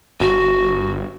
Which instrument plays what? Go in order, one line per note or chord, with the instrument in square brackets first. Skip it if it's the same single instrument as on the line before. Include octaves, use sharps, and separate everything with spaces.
[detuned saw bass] G1 [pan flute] F#4